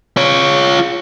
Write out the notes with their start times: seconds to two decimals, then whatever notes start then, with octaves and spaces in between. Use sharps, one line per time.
0.17 F4 C#5